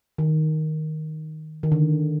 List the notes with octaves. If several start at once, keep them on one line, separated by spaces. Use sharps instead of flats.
D#3
D#3
D3